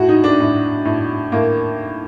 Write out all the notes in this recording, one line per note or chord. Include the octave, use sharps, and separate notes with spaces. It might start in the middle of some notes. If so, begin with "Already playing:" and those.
Already playing: A2 F#4
D#4
D4
A2
A2
A2 A#3